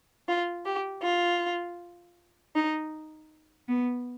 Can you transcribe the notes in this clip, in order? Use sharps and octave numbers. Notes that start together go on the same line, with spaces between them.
F4
G4
F4
D#4
B3